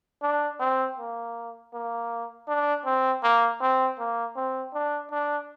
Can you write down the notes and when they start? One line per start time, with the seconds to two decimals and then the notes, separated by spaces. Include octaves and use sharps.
0.22 D4
0.60 C4
0.98 A#3
1.73 A#3
2.48 D4
2.85 C4
3.23 A#3
3.61 C4
3.99 A#3
4.36 C4
4.74 D4
5.11 D4